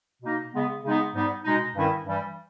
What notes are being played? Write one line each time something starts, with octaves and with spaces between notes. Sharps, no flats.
B2 A#3 D#4
C#3 G#3 B3
C#3 G#3 B3 D#4
G#2 G3 B3 D#4
B2 G#3 D#4
G2 D#3 G3 C#4 E4
G2 E3 G3